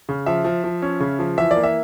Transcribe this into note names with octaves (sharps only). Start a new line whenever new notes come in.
C#3
F3 E5
F3
F3
C#4
C#3
F3
E3 E5
D5
A#3
E5